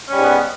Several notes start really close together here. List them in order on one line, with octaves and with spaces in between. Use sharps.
C#4 G3 G#2 B3